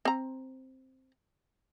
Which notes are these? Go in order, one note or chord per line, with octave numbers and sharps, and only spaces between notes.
C4 A#5